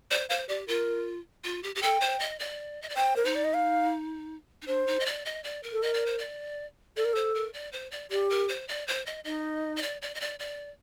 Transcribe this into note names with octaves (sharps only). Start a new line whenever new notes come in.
C5 D5
C5 F5
G4 D5
F4 A#4
F4
G4
G4
A4 G5
C5
D#5
D5
D#5
D5
C5 G5
A#4
D#4 C5
D5
D#5
F5
D#4
D4 C5
D#4
D#5
D5
D#5
D5
A#4
A4
A#4 D#5
D5
C5
D5
A4 D5
A#4
A4 C5
A#4
D5
C5
D5
G4 D5
A#4
C5
D5
C5
D#5
D#4 D#5
D#5
D5
D5
D#5
D5
D5